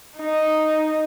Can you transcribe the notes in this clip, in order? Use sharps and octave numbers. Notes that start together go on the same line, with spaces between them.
D#4